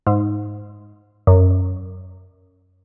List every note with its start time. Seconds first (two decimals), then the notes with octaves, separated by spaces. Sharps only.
0.07 G#2
1.27 F#2